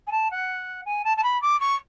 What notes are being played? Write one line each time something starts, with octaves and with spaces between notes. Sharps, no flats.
G#5
A5
F#5
G#5
A5
A5
B5
D6
C#6